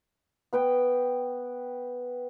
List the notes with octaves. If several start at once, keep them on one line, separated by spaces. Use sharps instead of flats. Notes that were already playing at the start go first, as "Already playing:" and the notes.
B3 B4 G5